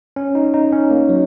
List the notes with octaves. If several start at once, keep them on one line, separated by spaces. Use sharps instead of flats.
C#4
D#4
D#4
C#4
A#3
F#3